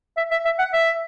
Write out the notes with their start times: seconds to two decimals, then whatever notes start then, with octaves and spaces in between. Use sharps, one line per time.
0.17 E5
0.31 E5
0.45 E5
0.59 F#5
0.73 E5